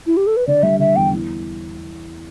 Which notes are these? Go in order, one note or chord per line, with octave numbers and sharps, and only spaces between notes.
E4
G4
A4
B4
D3 D5
G3 E5
D3 E5
E2 G5
E3